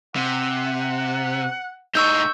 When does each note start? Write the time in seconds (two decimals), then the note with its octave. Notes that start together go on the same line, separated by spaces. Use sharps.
0.16 C3 F#5
1.95 A2 D#4 C#6 E6 G6